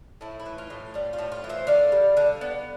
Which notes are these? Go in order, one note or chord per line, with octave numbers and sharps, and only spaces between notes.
A2 E4
E4
E3
F4
A2
G3 F4
F4
A2
F4
E3
C5 E5
D3 D5 F5
G3
D3
B3